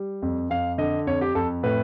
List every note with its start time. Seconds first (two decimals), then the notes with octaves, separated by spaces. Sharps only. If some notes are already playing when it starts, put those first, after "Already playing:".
Already playing: G3
0.22 F2
0.50 F2 F5
0.78 D3 D#5
1.07 F2 C#5
1.21 G4
1.35 F2 A4
1.63 A2 B4